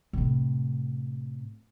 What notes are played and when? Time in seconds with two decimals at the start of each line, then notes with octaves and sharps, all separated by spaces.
0.13 A2 C3